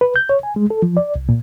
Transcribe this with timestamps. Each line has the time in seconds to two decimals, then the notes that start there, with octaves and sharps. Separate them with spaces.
0.01 B4
0.16 G6
0.29 C#5
0.43 G#5
0.56 G#3
0.70 A4
0.82 F3
0.97 D5
1.16 C2
1.29 A#2